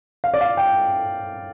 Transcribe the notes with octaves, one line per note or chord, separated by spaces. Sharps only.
F5
D5
F5
G5